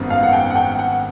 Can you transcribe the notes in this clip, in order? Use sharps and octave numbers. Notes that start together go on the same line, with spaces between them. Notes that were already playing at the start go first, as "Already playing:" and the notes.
Already playing: G#1 F#2 D#3 G3 B3
F5
F#5
G5
F#5
G5
F#5